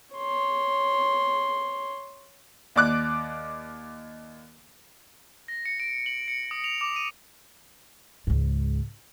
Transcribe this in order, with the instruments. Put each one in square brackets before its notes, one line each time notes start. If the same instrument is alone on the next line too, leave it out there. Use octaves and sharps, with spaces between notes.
[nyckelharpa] C#5 C6
[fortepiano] D#2 D5 D6 F#6
[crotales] A#6
C#7
D7
F#7
C#7
D#6
F7
D6
D#7
[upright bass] C#2 G#2